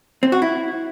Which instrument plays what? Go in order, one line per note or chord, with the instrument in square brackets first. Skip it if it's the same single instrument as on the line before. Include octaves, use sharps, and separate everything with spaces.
[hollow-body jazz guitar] C4
F#4
E4